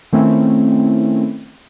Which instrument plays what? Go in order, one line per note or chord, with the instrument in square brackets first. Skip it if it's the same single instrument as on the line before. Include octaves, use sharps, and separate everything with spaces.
[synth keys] D#3 A3 C4 C#4 E4